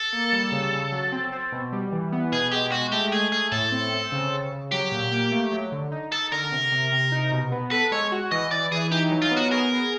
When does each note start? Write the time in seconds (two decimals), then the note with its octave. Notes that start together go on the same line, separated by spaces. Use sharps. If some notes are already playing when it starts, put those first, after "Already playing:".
Already playing: A4
0.13 A#3
0.33 G3
0.52 C#3
0.73 C#3
0.92 F#3
1.12 C4
1.32 C4
1.52 B2
1.72 G3
1.92 E3
2.12 B3
2.32 B2 G#4
2.52 G#3 G4
2.72 G#3 F#4
2.92 A3 G4
3.12 A3 G#4
3.32 A3 G#4
3.52 A2 A4
3.72 C4
3.92 C4
4.12 C#3
4.32 C#3
4.52 C#3
4.71 F#3 G4
4.92 A#2
5.12 A#3
5.32 A3
5.52 F#3
5.72 D3
5.92 D#4
6.12 D#4 A4
6.32 D3 A#4
6.52 C3
6.72 C3
6.92 C3
7.12 D#4
7.32 B2
7.52 B3
7.71 A4 B4
7.92 G#3 C#5
8.12 F#4
8.32 E3 D#5
8.51 E3 D5
8.71 E3 G#4
8.91 D#4 G4
9.11 F#3
9.22 F4
9.31 B3
9.37 F#4
9.51 G#4 A#4
9.71 G#4